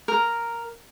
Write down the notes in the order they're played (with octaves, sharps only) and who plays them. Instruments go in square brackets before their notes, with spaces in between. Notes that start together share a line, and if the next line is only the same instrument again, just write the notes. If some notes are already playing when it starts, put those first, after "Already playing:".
[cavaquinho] A#4